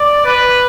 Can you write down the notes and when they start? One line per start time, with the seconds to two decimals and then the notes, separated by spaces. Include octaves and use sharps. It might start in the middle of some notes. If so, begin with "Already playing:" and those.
Already playing: D5
0.25 B4